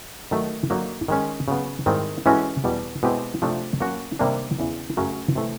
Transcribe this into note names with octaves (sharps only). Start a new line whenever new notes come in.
D#3 F#3 A3
D3 F#3 A#3 D#4
D#3 G#3 C#4
C#3 F#3 B3
G#2 D#3 G3 C4 E4
E3 G#3 C#4 F#4 A4
E2 B2 G3
B2 G#3 C4 E4 G4
C3 F3 A3 D4
F#3 A#3 C#4 F#4
C3 D#3 G3 A#3 D4
E2 C#3 E3
F#2 C#3 F#3 A3 C#4
C3 E3 A3